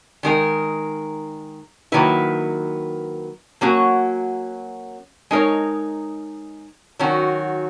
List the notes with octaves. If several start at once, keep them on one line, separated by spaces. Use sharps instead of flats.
D#3 G#3 D#4 A#4
D#3 F#3 A#3 E4 B4
F#3 A#3 C#4 F#4
G#3 D#4 A#4 C#5
D#3 F#3 C#4 F#4